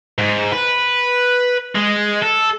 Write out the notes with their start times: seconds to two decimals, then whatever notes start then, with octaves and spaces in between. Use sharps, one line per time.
0.18 G#2
0.53 B4
1.75 G#3
2.23 A4